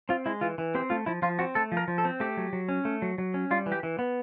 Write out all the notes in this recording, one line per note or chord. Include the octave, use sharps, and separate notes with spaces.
C4 F4
G#3 E4
E3 F4
E3
C4 G4
A3 F4
F3 E4
F3 F4
C4 F#4
A3 A4
F3
A#4
F3
A4
C4
A3 G4
F#3
F#3
C#4
A3
F#3
F#3
C#4
G3 F4
E3
G4
E3
B3